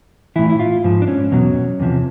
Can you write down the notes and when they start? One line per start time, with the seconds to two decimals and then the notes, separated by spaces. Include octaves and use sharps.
0.36 A2 E3 E4
0.50 E4
0.59 F4
0.84 G#2 F3
1.02 D4
1.08 C#4
1.32 E2 B2 F#3
1.80 E2 C3 F3